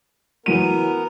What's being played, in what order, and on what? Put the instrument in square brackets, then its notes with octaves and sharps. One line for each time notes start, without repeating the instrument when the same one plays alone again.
[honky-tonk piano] E3 F#3 D#7 [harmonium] B3 A#4